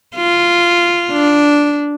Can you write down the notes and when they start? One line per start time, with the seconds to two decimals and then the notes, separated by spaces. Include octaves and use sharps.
0.16 F4
1.12 D4